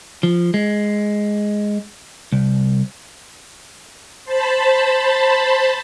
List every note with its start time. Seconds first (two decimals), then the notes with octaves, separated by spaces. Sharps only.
0.23 F3
0.54 G#3
2.32 C2
4.24 C5 A5 B5